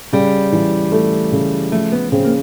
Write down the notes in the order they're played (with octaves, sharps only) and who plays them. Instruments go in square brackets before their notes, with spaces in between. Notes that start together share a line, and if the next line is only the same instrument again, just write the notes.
[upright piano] C#3 [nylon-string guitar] G3
[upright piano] E3
A3
C#3
[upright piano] F3 [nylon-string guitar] A3
[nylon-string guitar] B3
[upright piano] C#3 [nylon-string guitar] C4
[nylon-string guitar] A#3